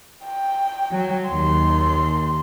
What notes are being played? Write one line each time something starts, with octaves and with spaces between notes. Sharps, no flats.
G5
F#3
D#2 C6